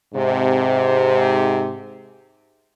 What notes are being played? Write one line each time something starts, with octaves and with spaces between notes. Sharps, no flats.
G#2 C3